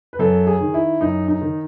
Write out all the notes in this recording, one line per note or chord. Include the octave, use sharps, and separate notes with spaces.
B4
F#2 A4
G#4
D#3
E4
F#2 D#4
D#4
D#3